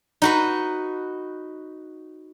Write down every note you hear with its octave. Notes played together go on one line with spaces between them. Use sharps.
D#4 F#4 B4